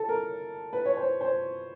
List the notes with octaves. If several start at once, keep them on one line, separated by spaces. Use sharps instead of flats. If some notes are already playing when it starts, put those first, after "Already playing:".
Already playing: A4
A#4
B4
C#5
C5
C5